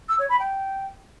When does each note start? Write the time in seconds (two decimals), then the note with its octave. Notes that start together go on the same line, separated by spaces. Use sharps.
0.09 E6
0.19 C#5
0.29 B5
0.39 G5